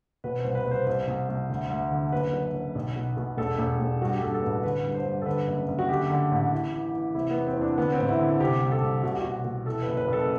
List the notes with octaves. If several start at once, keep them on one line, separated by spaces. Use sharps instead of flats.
B2 B4
C5
C2
B4
C2
C5
C2 C5
C2
C2
D2
D2
D3
F#1 B4
F#2
F#2
B1
B2
B2
E1 A4
E1
E1
G2 F#4
G4
G2 A4
A4
A1 B4
D3 B4
G2
C5
G2
A4
D3 B4
F#1
F#1
F#4
D3 G4
D3
A1
E3
E3
E3
C3 E4
B3
E2
C4
E2
D4
D3 B3
C4
A1
E4
D3
C3 G4
C2
A4
C2
C2 F#4
G4
B2 F#4
B2
E3 A4
F#1 B4
B4
F#1 A4